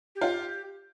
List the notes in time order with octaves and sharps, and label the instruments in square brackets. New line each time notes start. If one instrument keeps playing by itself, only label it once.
[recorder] G4
[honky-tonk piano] F4